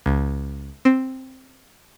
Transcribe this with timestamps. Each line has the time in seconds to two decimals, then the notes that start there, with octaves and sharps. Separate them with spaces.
0.06 C#2
0.85 C4